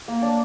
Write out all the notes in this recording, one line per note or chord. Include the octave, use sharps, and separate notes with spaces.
A#3
D4